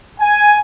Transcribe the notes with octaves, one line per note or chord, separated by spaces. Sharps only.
G#5